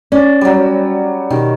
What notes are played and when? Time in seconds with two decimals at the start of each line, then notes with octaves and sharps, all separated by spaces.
0.12 C#4 D5
0.41 F#3 G3
1.30 B2 D#3 G4